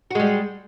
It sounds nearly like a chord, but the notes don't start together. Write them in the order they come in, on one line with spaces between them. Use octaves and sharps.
F#4 G#3 G3